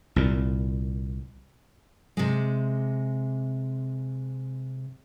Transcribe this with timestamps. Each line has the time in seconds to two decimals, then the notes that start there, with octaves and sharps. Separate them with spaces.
0.16 C2 A#2
2.17 C3 G#3